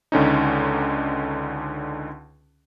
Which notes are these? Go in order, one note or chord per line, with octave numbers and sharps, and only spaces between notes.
C#2 D3 C#4 D#4